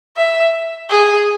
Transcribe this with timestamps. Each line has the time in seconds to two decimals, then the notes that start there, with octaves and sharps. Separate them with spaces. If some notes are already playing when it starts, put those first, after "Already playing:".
0.17 E5
0.90 G#4